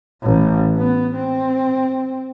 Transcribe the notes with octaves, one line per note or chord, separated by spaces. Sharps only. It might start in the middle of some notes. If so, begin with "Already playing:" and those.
A1
B3
C4